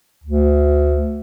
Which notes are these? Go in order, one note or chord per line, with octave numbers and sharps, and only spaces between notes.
D2